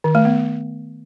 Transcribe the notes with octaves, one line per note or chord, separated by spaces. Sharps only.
D#3
A3
B3